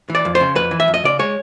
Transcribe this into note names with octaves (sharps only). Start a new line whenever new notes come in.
E3
D5
F2
C5
C#3
F2 B4
E3
E5
F2
D#5
C#3 D5
G#3 C#5